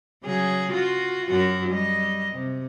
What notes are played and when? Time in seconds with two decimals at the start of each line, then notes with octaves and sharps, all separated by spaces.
0.24 C#3 F#3 G#4
0.73 F4 F#4
1.29 F#2 F#4
1.69 G3 D#5
2.33 C3